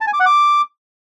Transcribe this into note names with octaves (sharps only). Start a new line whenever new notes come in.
A5
G#5
D6
F#5
D6